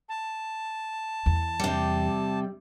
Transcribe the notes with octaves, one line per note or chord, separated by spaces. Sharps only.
A5
E2
C3 G3